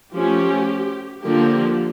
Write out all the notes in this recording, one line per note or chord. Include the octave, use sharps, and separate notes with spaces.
F3 A3 C#4 G4
D3 F3 A#3 G4